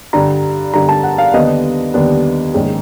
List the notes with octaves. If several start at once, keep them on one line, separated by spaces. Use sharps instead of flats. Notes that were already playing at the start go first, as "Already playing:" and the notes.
G2 D3 G3 A#5
G2 D3 G3 A#5
A5
F#5
F5
D#2 D3 G3 B3 D4 D#5
D#2 D3 G3 B3 D4
A#1 G#2 D#3 G#3 C#4